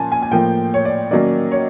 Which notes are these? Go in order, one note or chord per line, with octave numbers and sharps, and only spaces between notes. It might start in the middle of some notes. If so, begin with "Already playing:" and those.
Already playing: A#2 F3 A#3 C#4 G#5 A5
G#5
G#5
A2 F3 A#3 G5
C#5
D5
D#3 F#3 A#3 C#4 D5
C#5